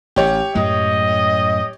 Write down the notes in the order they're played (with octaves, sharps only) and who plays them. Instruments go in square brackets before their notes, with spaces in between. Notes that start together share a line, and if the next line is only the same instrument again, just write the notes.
[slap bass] A1 [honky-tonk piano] G4 C#5
[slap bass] F#2 A2 G#3 [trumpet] D#5